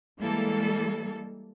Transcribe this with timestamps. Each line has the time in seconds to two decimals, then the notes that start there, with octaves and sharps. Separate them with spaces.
0.19 E3 G3 G#3 A#3 A4